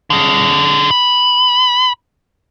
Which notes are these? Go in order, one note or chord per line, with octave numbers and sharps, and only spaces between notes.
D3 G#4
B5